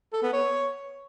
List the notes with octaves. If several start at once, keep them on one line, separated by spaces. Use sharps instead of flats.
A4
B3
C#5